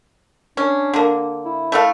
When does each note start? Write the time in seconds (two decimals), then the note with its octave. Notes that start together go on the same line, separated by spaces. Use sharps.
0.57 C#4 D4
0.94 D3 A#3
1.45 E4
1.72 A3 A4 F5